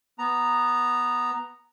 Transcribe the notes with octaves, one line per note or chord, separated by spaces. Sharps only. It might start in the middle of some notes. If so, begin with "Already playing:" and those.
B3 A#5